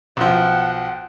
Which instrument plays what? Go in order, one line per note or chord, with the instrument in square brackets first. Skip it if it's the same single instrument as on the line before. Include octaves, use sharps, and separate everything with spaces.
[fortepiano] B1 F3 [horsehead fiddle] F#5 G5